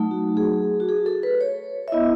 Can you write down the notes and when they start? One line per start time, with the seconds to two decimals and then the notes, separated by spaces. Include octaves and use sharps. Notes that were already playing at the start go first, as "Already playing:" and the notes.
Already playing: F#3 A3 D#4
0.11 F#4
0.37 G#4
0.80 F#4
0.89 G#4
1.06 A4
1.23 B4
1.41 C#5
1.88 E5
1.92 B3 E4 D#5